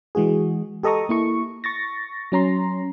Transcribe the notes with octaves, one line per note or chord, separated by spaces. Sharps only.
E3 G#3 F#4 G#4
G4 A4 D#5 A#5 C#6 D#6
A#3 E4 C#6
C#6 A6 A#6
F#3 C#4 A#5 C6